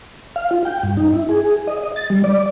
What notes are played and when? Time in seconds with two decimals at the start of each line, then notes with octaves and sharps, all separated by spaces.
0.36 F5
0.51 F4
0.65 G5
0.83 G2
0.97 D#4
1.14 E4
1.29 G#4
1.67 D#5
1.84 D#5
1.96 A6
2.10 G3
2.24 D5